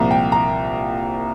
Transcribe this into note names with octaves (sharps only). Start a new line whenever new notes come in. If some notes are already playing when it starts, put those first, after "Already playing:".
Already playing: C2 A#2 F3 A#5
G5
A#5